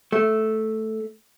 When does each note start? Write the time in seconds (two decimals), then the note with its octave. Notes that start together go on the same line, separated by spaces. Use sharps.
0.12 A3